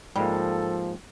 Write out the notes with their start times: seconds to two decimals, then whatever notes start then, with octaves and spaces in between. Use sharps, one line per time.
0.16 G#2 F3 G3 G#3 A#3 A4